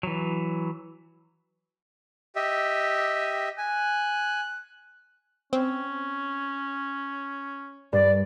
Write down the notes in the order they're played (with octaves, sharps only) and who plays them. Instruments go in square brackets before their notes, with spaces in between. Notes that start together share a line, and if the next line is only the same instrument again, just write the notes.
[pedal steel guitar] E3 F#3
[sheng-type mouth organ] G4 D#5 E5
[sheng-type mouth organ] G#5 [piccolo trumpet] F#6
[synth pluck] C4 [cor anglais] C#4
[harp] G2 [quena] D5